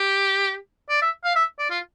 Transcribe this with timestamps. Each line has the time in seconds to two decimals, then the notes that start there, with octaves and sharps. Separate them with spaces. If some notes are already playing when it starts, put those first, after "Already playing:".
Already playing: G4
0.89 D5
1.02 E5
1.24 F5
1.36 E5
1.59 D5
1.71 F4